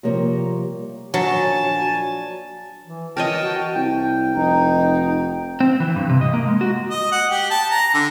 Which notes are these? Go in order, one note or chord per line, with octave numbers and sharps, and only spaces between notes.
C3 F3 G3 A#3 C#5 A#5
A#1 F#3 D4 G#5 A5
E3
E3 A#4 C#5 D#5 G5 A5
F#4
C2 G5
F1 D#4
C4
E3
G2
C3
D#5
A#3
G#3
F#4
D#5
F#5
G4
A5
A#5
D3